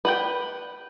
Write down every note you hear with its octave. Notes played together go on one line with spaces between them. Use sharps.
B4 F#5 G5